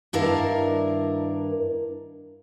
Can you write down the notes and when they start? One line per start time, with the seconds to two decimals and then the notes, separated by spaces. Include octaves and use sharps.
0.13 G2 D#3 D4 E4 A#4 F5